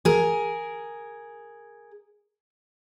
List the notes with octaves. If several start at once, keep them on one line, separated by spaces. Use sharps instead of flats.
G#4 A#4